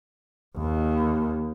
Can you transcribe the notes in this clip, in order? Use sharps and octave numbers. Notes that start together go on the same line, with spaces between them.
D#2